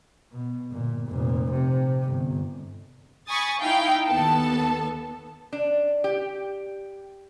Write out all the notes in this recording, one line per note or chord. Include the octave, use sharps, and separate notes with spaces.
B2
G1 A#2
F1 A#2
C3
G1
G#5 B5 C#6 D#6 A6
D#4 E4 F5 G5
D#2 B3 A4 A5
D4
G4